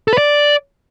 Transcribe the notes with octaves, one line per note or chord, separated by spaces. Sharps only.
A4
B4
D5